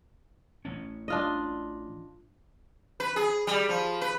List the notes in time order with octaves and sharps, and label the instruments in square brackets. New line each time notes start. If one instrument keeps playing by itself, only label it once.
[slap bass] A1 C#4
[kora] D4 F4 D#5
[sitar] B4
G#4
G3
F3
B4